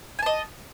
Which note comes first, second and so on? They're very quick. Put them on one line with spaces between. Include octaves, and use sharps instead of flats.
G#5 A5 D#5